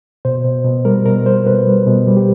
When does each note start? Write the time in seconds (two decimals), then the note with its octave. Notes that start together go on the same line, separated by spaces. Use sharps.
0.25 B2 C5
0.44 B2
0.65 B2
0.85 G3 A#4
1.06 B2 A#4
1.26 G3 C5
1.46 B2 B4
1.67 G3
1.87 B2
2.07 G3
2.17 G4